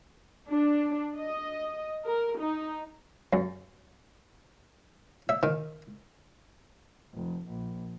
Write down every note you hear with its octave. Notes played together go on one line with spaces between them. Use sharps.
D4
D#5
A#4
D#4
F#2
E5
D#3
F1
A#1